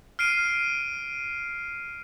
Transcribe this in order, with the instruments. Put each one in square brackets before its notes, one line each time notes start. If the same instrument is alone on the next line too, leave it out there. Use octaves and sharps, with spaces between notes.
[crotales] F6 C7 D7 D#7